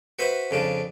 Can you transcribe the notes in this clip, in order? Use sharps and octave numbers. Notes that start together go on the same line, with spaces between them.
F#4 B4 C5 E5
F2 C#3 D4